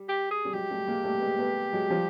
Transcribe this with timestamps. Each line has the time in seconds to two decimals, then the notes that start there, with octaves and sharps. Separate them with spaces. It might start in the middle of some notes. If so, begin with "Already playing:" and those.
Already playing: G3
0.08 G4
0.31 G#4
0.45 G3
0.53 F#3 G#3 G4
0.71 G3 A3
0.88 G#3 A#3
1.04 G3 A3
1.18 B3
1.22 G#3 A#3
1.39 A3 B3
1.73 F#3 G#3
1.90 F3 G3